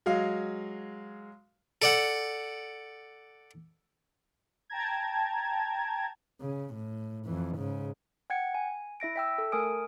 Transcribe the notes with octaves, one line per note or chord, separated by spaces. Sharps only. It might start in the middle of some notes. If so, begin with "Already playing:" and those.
F#3 G#3 F5
A4 D5 F#5
G5 A5 A#5 G#6
C#3
A2
F2 E3
G#2 C#3
F#5 G5 G#6 C#7
G#5
E4 E5 A#6 D7
E5 G5 E6
A4
A3 A#4 G#5 D#6 D7